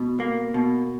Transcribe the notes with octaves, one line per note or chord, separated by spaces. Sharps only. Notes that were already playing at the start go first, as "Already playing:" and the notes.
Already playing: B2
A#3
B2